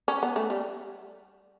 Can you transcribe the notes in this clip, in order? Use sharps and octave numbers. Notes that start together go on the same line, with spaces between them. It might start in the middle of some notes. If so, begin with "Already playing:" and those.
C#4
B3
A3
G3